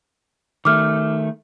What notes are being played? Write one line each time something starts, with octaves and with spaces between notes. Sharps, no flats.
D#3 A3 D6 F6